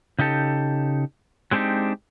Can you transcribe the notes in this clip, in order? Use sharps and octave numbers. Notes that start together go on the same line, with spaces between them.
C#3 D#4 G4 A4
F#3 G#3 C4 D4 D#4 G4